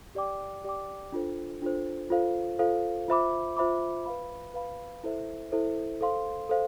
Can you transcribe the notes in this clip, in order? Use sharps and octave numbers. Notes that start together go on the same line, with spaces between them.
G4 D5 G5 D6
G4 D5 G5 D6
D4 F4 A4 C5
D4 F4 A4 C5
F4 A4 C5 F5
F4 A4 C5 F5
F4 C5 E5 B5 D6
F4 C5 E5 B5 D6
B4 F5 B5
B4 F5 B5
E4 A4 C5 E5
E4 A4 C5 E5
A4 C5 F5 C6
A4 C5 F5